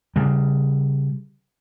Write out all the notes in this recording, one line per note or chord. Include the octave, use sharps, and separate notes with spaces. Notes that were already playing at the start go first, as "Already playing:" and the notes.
C#3 G3